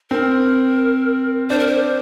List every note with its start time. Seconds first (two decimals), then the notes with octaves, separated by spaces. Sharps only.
0.10 C4 A#4
1.50 D4 C5
1.59 A#4
1.67 C5